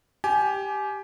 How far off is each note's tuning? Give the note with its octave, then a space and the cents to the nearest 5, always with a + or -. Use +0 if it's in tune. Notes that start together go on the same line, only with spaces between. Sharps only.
G4 +0 G#5 +25